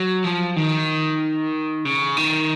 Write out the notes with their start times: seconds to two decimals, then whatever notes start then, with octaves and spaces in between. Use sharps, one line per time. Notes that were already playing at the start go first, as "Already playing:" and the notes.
Already playing: F#3
0.24 F3
0.56 D#3
1.85 C#3
2.17 D#3